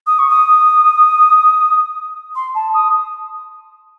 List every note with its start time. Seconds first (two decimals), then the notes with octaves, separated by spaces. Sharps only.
0.07 D#6
0.19 C#6
0.30 D#6
2.35 C6
2.55 A5
2.74 D#6